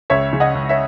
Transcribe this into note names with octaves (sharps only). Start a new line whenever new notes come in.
C#2 C#5 E5
C#3
D#5 F#5
C#2
C#5 E5